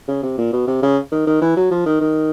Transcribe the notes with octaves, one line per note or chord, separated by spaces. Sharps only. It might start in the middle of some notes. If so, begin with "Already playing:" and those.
C#3
C3
A#2
B2
C3
C#3
D#3
D#3
E3
F#3
F3
D#3
D#3